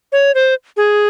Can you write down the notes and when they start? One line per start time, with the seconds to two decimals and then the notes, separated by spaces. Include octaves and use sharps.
0.12 C#5
0.35 C5
0.77 G#4